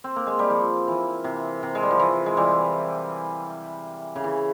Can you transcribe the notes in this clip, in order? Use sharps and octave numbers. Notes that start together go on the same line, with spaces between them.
C4
A#3
G#3
G3
F3
E3
C3
C3
G#3
G3
F3
E3
G#3
E3 G3
C#3
E3